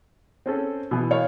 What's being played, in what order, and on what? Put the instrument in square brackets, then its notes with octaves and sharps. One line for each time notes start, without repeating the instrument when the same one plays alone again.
[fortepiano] C4 C#4 A4
B2 E3
[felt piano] C#5 F5